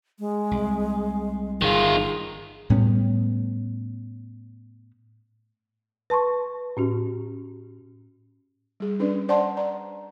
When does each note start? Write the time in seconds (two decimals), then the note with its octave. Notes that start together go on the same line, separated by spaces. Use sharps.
0.19 G#3
0.51 C2
1.62 G1 D#3 F4 G#4
2.70 A2 G3 B3 C#4
6.10 B4 A5 C6 C#6
6.77 A2 C#4 F#4
8.80 G3 G#4
9.00 C#4 D4 B4 D5
9.29 C5 D5 F#5 A5 C6
9.57 D5 A#5